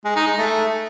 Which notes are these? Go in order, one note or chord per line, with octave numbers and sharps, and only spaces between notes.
G#3
D#4
G#3
A3